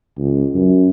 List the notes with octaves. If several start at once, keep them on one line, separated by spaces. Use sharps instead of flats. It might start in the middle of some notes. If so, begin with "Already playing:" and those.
C#2
F#2